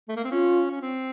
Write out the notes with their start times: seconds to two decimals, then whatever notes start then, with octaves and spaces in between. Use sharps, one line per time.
0.09 A3
0.17 A#3
0.24 C4
0.31 C#4 F4
0.71 C#4
0.82 C4